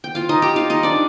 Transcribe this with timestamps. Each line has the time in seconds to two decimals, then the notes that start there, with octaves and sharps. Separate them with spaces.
0.04 G5
0.15 F4 F5
0.29 D#4 D#5
0.42 G4 G5
0.56 F4 F5
0.70 D#4 D#5
0.83 D4 D5